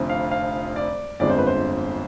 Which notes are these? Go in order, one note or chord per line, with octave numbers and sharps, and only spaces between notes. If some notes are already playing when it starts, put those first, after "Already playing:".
Already playing: F1 F2 D3 F3
F5
F5
D5
G1 F2 D3 G#3 D5
C5
B4
C5